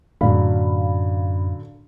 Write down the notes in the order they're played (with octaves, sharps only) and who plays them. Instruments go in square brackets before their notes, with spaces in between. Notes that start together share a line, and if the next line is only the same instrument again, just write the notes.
[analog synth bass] F#2 [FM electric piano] A2 F5 B5 [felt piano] D3 F#3